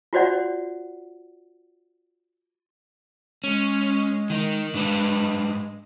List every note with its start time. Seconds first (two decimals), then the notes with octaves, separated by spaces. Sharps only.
0.13 F4 F#4 C5 D5 F#5
3.44 G#3 C#4
4.30 D#3 D#4
4.74 G#2 G#3 D4 B4